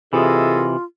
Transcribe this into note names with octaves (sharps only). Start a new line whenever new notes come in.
C3 E3 F4 G#4 A4 D#5